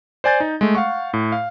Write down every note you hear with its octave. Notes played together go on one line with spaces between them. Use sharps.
C5 D5 G#5 G6 A6
D#4
G#3 A3
F5 F#5 C#6
A2
F5